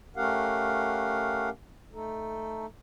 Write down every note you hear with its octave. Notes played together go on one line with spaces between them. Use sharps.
A3 C#4 G4 A#4 F5 F#5
A3 D#4 A4